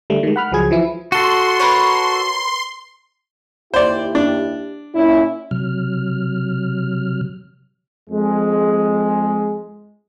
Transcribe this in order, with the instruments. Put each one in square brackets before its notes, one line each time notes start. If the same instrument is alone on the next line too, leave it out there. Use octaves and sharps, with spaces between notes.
[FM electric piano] D3 G3 A3
D#3 G#3
F#5 B5 F6 F#6
C#2 F3 F#3 G#4 G#6
E3 F3 E4
[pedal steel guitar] F#4 A4 [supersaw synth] C6
[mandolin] A#4 B4 C#5
[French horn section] D#2 E4 G4 [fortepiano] C5 D5
[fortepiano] D4
[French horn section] A#2 C#4 E4
[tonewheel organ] C3 F#3 F6
[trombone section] F2 G#3